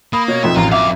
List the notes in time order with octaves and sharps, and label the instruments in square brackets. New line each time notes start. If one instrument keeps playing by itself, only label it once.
[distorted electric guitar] A#3 [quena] B5 [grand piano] D#6
[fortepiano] B2 [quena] C#5
[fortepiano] B1 F2 A#2 [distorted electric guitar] E5
[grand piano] A1 [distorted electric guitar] F4 [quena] A#5
[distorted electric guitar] F#2 F5 [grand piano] E5 [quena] D6